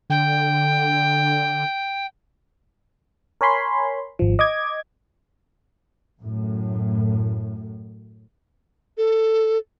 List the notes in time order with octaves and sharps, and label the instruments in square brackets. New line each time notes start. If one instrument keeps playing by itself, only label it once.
[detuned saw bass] D3 [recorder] G5
[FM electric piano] A#4 C#5 G#5 B5 C6
G#1 F3
D#5 D6 G#6
[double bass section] F#2 A2
[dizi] A4